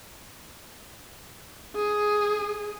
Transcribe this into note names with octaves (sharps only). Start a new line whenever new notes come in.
G#4